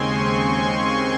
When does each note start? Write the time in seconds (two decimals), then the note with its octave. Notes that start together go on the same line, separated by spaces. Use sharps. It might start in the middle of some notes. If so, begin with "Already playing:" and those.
Already playing: D#2 C#3 G#3 C4 G#5 C6 C#6
0.26 C6
0.68 C6